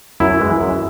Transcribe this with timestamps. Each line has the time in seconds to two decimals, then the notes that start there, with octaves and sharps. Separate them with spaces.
0.20 F#2 E4
0.40 E3 G#3
0.61 F#2